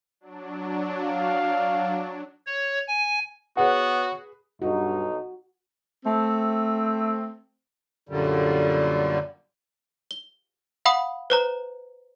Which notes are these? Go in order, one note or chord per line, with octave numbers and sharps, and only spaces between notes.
F#3 D4
F5
C#5
G#5
B3 F#4 G#4 B4 C#5 F#5
B1 G2 D#4 F#4
A3 C4
F#2 A#2 D3 G3
G7
F5 F#5 B5 D#6
B4 C5 A#5